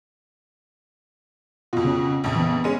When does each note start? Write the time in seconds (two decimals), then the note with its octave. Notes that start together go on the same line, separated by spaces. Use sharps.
1.73 F2 B2 F4
1.85 C#3 C#4
2.24 A#1 F2
2.36 E3 B3
2.64 G#3 C#4